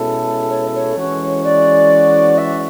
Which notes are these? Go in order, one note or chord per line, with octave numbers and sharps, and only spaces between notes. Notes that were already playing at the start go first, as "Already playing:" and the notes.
Already playing: B2 G#3 C#4 E4 A4
C#5
C#5
E3 G#3 C#4 F#4
D5
E5